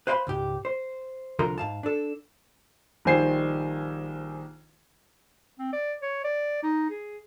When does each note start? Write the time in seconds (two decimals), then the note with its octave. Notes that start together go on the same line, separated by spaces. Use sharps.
0.07 B4 C5 F5 G5 B5 C6
0.27 C#2 G#2 G4
0.65 C5
1.39 C2 D3 F3 A#4 A#5 C6
1.58 G#2 F5 A5
1.83 D4 A4
3.05 A#1 D#3 G3 C5 G#5 C7
5.59 C4
5.73 D5
6.02 C#5
6.24 D5
6.63 D#4
6.90 G#4